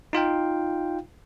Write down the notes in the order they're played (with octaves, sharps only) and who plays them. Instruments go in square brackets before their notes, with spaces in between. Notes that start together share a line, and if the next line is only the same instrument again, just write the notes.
[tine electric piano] D#4 F4 F5 G5